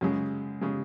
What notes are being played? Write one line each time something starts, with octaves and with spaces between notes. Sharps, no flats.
F#2 C#3 G#3
C#3 G#3